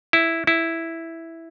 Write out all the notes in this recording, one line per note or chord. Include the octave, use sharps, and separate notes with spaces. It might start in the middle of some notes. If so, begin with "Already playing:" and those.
E4
E4